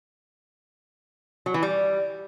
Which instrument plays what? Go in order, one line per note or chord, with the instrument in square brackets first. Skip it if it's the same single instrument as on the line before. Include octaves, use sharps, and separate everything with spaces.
[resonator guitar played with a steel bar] F#3
E3
G3